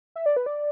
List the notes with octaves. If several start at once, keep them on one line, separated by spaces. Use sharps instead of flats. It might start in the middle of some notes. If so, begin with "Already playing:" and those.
E5
D5
B4
D5